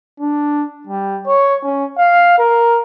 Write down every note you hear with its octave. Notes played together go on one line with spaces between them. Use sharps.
D4
G3
C#5
C#4
F5
A#4